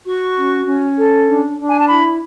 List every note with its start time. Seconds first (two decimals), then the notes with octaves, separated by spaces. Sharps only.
0.05 F#4 C#6
0.36 C#4
0.66 C#4
0.97 A4
1.27 D4
1.59 D4
1.71 G#5
1.80 A5
1.89 E4 B5